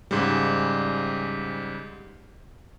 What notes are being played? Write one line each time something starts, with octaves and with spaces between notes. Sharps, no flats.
G#2 C#3 G3